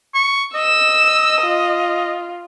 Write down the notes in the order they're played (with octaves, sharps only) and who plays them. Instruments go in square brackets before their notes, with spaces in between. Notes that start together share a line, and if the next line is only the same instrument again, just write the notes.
[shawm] C#6
[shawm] D#5 [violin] E6 E7
[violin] F4